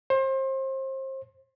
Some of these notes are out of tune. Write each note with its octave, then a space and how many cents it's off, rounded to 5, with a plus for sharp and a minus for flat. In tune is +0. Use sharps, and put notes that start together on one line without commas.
C5 +30